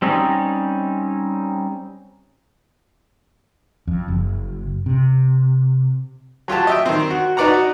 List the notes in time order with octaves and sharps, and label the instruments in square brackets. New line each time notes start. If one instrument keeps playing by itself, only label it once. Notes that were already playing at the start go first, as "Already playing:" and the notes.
[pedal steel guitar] G3 C4 C#4 D#4
[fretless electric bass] F2
F#1
C3
[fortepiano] F#3 F4 G4 A5
D#5 E5 G5
D#3 C4
F#4
D#4 F#4 B4 D5 F#5 A#5